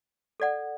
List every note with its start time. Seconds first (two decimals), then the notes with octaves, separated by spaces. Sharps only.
0.40 A4 D5 F#5